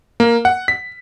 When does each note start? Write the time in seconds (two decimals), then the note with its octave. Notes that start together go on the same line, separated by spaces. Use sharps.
0.20 A#3
0.45 F#5
0.68 B6